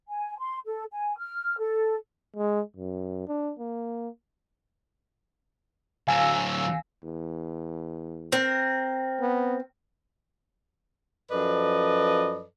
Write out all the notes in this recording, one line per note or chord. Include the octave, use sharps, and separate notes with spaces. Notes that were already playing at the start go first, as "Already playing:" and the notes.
G#5
C6
A4
G#5
F6
A4
G#3
F#2
D4
A#3
D2 F#3 F5 G#5 E6
E2
C4 A#4
B3
F#2 F3 A4 B4 D5 D#5